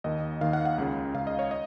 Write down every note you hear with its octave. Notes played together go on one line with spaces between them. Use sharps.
D#2 D#3 D#5
D#2 D#3 F5
F#5
F#5
C#2 C#3
C#2 C#3 F5
D#5
C#5
D#5